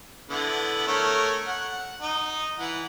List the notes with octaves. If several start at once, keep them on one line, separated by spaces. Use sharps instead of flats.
D3 B3 E4
A3 A#4 C#5
F#5
D#4
E3 F#5